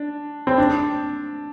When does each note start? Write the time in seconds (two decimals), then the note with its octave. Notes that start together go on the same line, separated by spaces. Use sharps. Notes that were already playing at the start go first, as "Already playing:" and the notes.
Already playing: D4
0.47 C4
0.58 D4